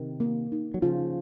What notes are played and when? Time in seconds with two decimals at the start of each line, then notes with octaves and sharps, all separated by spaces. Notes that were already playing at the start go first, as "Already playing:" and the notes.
Already playing: C3 D#3 A#4
0.20 A#3
0.52 D#4
0.74 F#3
0.82 C#3 F3 F4